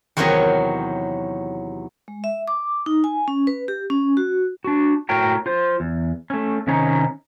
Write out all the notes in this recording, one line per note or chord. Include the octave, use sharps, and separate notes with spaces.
E2 C3 D#3 F#3 C#5 D#5
G#3
E5
D6
D#4
G#5
C#4
B4
G4
C#4
F#4
D4 F#4
A2 F#4 A#4 C#5 G5 A#5
F4 C5
E2
A3 C#4
C3 D#3 C#4 D#4 C#5 A#5